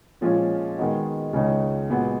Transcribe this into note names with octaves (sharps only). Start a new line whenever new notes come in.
A#2 F3 G#3 C#4 F4
D#3 G#3 B3 D#4 F#4
C#2 C#3 G#3 D#4
A#2 G#3 B3 F#4